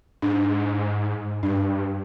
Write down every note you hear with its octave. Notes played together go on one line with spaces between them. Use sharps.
G#2 D4
G2 D4